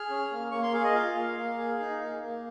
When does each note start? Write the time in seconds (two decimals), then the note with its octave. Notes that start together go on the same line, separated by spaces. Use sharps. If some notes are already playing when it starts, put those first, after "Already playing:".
Already playing: G#4 F6
0.10 C#4
0.31 A#3
0.52 A#3 C#6
0.63 C6
0.73 G#4 F5
0.84 D#5
0.94 F4 F5
1.15 A#3
1.37 A#3
1.58 G#4
1.80 D#4
2.01 A#3
2.22 A#3